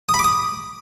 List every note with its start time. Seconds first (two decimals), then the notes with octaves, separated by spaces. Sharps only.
0.09 D#6
0.14 B5
0.19 D6
0.24 D#6